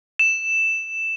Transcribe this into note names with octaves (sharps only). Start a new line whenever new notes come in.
E7